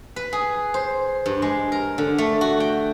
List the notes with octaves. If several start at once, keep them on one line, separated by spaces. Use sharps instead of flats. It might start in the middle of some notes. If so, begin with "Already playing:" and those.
B4
G#4
C5
G2
G#3
A#4
D3
A3
F#4
G5